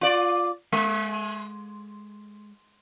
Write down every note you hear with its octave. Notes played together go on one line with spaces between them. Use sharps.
F4 D5
G#3